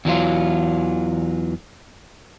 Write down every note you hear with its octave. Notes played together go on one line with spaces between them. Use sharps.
E2 E3 F#3 F4